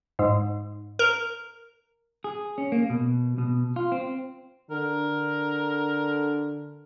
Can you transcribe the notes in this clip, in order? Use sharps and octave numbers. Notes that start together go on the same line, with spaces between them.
G#2
A#4
G#4
C#4
A#3
B2
B2
F4
C4
D3 A#4